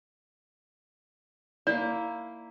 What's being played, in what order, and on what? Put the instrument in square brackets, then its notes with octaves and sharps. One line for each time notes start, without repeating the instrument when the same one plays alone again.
[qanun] A#3 E4 [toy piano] D5